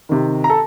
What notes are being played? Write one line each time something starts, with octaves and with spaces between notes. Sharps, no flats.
C3 D#3
A#5
A4 A5